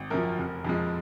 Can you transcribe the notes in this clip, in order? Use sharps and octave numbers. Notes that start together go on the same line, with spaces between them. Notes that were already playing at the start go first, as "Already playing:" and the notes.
Already playing: G#1
F#2 F3 A#4
F1
F2 F3 G#3